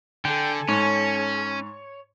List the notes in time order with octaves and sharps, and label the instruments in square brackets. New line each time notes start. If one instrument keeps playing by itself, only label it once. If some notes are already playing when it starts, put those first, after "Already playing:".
[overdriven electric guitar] D3 [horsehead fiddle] A4 G#5 [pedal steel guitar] G5
[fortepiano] G#2 [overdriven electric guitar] C#4 [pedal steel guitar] C#5